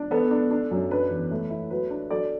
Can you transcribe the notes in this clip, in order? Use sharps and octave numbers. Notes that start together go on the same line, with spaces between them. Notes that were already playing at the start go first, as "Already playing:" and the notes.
Already playing: D4
B3 A4
D4
D4
F#2
D4 B4
E2
A3
E4
F#3 B4
D4
F#3 A4 D5